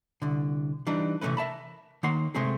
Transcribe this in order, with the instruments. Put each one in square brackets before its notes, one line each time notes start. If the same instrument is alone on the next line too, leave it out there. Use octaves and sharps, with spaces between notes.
[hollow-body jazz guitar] C2 D3
E3 G3 D4 D#4
C3 E3 G#3 A3 C#4 B4
A#4 E5 A5 B5
D#3 A#3 C#5 F#5 C6
C3 G#3 A3 C4 G#4